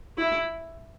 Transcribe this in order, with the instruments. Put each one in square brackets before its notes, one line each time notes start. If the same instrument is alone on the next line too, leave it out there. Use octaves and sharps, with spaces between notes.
[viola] E4